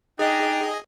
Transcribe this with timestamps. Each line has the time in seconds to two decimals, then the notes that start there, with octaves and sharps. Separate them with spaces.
0.19 D4 D#4 G#4 D#5 G5